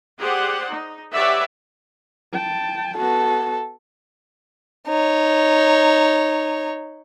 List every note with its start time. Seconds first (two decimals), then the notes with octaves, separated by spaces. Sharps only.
0.17 G4 G#4 C5 D5 F#5
0.69 D#4
1.13 G4 B4 C#5 D5 E5 F#5
2.33 G5 A5
2.98 B3 F#4 A4
4.87 D#4 C#5